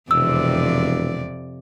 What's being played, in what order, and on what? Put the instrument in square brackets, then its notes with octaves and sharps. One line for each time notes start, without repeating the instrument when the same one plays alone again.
[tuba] E1 [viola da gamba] F2 C3 D5 [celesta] E6